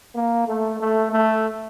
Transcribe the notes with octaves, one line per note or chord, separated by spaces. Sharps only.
A#3
A3
A3
A3